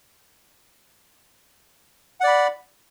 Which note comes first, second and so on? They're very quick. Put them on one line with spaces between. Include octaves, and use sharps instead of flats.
F#5 D5 B5